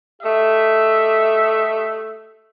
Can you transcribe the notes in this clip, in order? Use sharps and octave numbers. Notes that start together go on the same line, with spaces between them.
A3 G4 D#5 E5